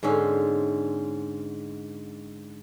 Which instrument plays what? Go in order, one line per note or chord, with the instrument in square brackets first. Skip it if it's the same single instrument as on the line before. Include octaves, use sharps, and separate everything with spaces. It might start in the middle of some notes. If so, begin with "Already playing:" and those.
[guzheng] G#2 D3 C4 C#4